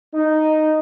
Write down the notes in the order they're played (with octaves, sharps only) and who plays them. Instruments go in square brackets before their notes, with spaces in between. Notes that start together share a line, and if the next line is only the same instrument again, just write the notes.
[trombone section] D#4